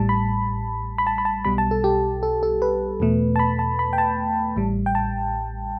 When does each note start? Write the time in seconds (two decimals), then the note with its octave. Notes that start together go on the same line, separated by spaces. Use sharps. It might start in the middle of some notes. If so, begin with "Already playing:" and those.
Already playing: A1 A2 G3 A5
0.09 B5
0.98 B5
1.07 A5
1.18 B5
1.25 A5
1.45 B1 B2 G3 B5
1.58 A5
1.71 A4
1.84 G4
2.23 A4
2.43 A4
2.62 B4
3.00 E2 B2 A3
3.36 A5
3.39 B5
3.59 A5
3.79 B5
3.93 G5
3.98 A5
4.56 A1 A2 G3
4.86 G5
4.95 A5